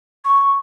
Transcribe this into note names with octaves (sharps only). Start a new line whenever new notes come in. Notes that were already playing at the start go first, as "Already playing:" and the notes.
C#6